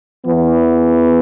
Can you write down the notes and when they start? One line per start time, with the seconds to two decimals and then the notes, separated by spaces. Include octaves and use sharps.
0.25 E2 E3 B3